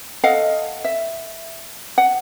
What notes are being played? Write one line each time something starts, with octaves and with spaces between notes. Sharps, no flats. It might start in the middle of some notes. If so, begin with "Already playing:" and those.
A4 D#5 F5 F#5
E5
F#5